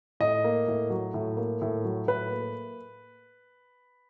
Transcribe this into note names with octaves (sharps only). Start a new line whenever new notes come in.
A2 D#5
A#3
A2
F#3
A2
A#3
A2
F#3
A2 B4
A#3